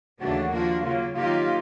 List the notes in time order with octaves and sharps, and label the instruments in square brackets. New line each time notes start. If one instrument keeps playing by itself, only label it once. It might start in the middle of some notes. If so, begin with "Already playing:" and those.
[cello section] D#2 C#3 E3 A3 D4 [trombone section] F#4
[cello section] F3 A#3 D4 F#4 [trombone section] F4
[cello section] C#3 F#3 A#3 [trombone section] F4
[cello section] D#3 F#3 A#3 D#4 G4 [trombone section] F4